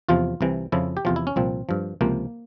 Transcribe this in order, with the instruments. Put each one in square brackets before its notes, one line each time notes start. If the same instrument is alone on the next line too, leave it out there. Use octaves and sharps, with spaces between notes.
[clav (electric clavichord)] E2 C3 F3 F4
C2 C3 E3
F2 C#3 F3 E4
G4
E2 C3 F3 F4
E4
C#4
C2 A#2 F3 C4
G2 F3
C#2 C3 F3 A#3